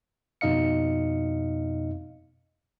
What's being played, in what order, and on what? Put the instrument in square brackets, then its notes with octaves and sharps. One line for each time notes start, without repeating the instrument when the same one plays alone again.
[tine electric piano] F2 B2 D#4 D#5 F5 C#7